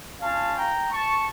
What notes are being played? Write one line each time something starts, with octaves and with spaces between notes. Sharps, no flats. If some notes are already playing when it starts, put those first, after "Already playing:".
C#4 F4 F5 A5
G5 A#5
A5 C#6